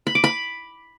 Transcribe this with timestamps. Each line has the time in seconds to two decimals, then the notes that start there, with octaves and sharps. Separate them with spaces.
0.07 B5
0.15 D6
0.24 B5